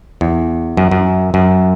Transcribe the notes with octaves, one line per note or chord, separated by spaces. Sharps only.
E2
F#2
F#2
F#2